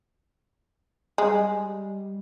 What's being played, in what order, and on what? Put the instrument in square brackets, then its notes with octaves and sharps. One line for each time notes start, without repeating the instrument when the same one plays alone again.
[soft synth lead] G3 [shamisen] G#3